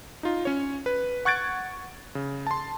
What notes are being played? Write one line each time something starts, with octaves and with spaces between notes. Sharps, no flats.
D#4 F4
C#4 C#5
B4
F#5 C#6 F#6 G#6 A6 D7
C#3
A5 C6